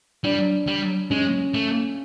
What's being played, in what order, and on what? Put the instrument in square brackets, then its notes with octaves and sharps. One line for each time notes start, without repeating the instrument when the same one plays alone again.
[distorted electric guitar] G3 [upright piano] D4
[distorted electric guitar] G3
[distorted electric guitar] G#3 [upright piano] C#4
[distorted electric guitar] A3